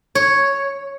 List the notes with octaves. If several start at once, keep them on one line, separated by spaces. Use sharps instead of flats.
C#5